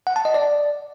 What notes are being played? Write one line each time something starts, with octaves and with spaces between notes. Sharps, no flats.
F#5
A5
D#5
D5